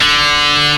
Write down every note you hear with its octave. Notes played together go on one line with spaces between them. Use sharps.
D3